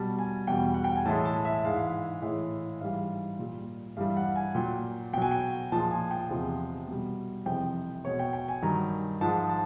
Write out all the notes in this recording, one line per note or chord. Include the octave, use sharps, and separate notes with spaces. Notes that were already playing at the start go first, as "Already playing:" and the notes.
Already playing: B2 G3 A5
G#5
E2 B2 G3 G5
F#5
G5
G#5
A2 E3 G#3 A5
A5
E5
G#2 E3 G#3 F5
A2 E3 G#3
G#2 E3 G3 F5
A#2 G3
G2 E3 G3 F5
F#5
G#5
A#2 F#3 G5
B2 F#3 G5 G#5
G5
A#2 F3 G#3 A5
G#5
G5
E2 C3 F3 G#3
B2 G3
F2 C3 E3 G#3 G5
B2 G#3 C#5
G5
G5
G#5
G2 D#3 F#3 A#5
G#2 F3 G#3 A5
A5